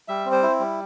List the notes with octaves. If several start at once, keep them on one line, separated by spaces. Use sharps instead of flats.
G3 E5
C4
C5
E4
G3